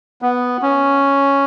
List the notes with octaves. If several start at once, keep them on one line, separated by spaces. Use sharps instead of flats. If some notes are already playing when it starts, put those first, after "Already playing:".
B3
C#4